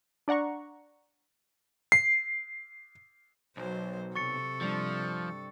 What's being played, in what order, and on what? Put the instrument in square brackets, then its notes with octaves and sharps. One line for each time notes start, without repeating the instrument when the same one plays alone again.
[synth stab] D4 D5 F#5 A#5 C#6
[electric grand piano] C7
[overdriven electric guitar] B1 [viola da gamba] F#3 C5
[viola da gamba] C3 A4 [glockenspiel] C#6 A6 C#7
[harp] G2 G3 D4 [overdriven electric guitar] F3